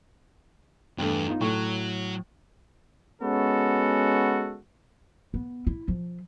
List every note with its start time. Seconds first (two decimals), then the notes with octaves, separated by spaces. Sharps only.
0.98 E2 G2 A3
1.27 D#4 F4
1.41 A2 F#3 A3 C#6
3.22 G#3 B3 C#4 F#4 A4
5.34 B3
5.67 E4
5.88 F3